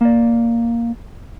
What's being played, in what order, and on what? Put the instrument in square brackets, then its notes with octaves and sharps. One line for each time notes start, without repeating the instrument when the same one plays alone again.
[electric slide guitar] A#3 D5